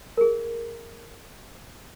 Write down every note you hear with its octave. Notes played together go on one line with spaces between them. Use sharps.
G#4 A#4